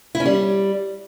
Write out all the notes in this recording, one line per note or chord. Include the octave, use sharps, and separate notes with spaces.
E4
C#4
G3